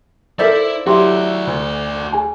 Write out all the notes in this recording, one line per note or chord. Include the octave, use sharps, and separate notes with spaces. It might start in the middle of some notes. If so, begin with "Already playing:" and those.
E4 A4 A#4 C5 D5 E5 A6
F#3 E4 F#4 G4 D5 G5 C6
D2
G#4 G#5 A5